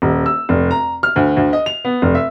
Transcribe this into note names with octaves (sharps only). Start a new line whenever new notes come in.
D#1
E6
F1
A#5
F6
D2
D2
D#5
F7
B3
F1
E5